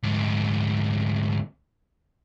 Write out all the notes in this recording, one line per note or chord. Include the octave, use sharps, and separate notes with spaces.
D2 G#2